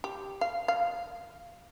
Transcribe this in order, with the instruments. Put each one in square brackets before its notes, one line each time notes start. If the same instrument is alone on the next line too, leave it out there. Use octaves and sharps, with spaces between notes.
[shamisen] G4
F5
F5